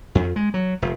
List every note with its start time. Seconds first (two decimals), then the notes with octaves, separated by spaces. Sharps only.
0.15 F2
0.36 G#3
0.54 F#3
0.82 F1